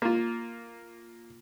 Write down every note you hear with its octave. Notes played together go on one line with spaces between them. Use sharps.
A#3 F4